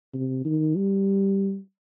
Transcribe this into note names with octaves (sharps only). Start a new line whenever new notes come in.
C3
D#3
G3